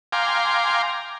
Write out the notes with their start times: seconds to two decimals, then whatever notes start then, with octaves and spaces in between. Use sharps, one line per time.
0.12 F5 G5 G#5 A#5 C6 D6